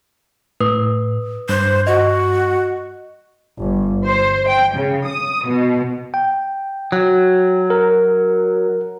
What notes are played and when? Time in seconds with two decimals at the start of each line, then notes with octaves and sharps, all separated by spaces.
0.60 A2 B4 D#6
1.49 G2 C5 F#6
1.87 F#4 D#5
3.60 G1
4.05 C5
4.47 G5
4.76 C#3
5.06 D#6
5.46 B2
6.14 G5
6.92 F#3
7.70 A#4